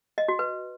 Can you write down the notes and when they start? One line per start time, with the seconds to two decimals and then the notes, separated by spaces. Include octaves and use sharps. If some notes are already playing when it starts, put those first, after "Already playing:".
0.18 D#5
0.28 F#4
0.39 B4